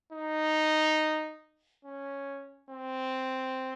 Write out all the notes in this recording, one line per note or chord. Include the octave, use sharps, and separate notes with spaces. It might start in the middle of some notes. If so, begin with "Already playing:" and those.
D#4
C#4
C4